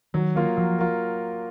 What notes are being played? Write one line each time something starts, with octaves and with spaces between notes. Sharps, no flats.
D#3 F#3
A#3 F4 A#4
F3 F#3
F4 A#4